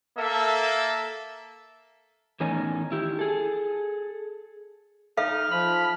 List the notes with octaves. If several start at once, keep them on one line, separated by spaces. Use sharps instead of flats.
A#3 A4 E5
E2 A2 D#3 C#4 D#4 G#5
E4 G4
G#4 A4
D#4 A4 E5 F5 F6
F3 B5